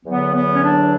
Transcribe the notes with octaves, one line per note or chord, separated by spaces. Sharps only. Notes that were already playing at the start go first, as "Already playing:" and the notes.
E2 D3 F#3 B3
B3
C#4
D4